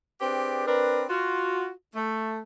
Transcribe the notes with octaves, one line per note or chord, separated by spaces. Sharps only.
C4 D4 G4 G#4 B4
C4 D4 A#4 B4
F4 F#4
A3